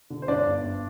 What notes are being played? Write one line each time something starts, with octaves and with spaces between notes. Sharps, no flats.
D3
C5
G2 D4 D5
G1
G2